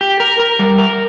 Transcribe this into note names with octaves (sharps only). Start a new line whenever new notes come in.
G4
A#4
A#4
G3
A#4